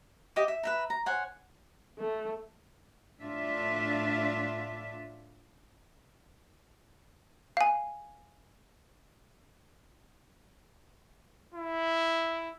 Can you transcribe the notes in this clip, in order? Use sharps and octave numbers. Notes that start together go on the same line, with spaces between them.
G4 D#5 E5 D6
E5
B4 E5 A#5
A#5
C5 C#5 F#5 G#5
A3
A2 D4 F4 E5
F5 G#5
E4